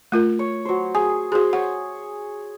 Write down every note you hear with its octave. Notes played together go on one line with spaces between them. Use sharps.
A3 F4 A#4
C#5
F#3 C5
G#4 G#5
F#4 G#4 C5
C#5 F#5